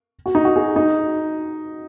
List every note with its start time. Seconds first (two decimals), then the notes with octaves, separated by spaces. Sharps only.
0.26 F#4
0.35 D#4
0.45 F#4
0.56 G#4
0.76 D#4